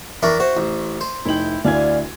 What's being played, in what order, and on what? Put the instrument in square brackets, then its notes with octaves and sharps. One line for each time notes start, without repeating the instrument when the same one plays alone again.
[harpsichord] E3 D4 A#4 [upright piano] E5 C#6
[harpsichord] F#4 [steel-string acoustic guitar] C5
[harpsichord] A1
C5
[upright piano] F1 D#4 F#7 [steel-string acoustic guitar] E4 G5
[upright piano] D2 E4 G#6 [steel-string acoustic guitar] D5 F5 G#5